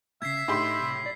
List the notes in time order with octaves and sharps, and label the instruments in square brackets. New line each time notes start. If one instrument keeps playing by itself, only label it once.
[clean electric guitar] A2 C#3 [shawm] E5 [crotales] G#6 B6 C7
[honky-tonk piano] A2 G4 C6 [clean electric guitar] D#4
[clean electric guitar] C2
B1 D5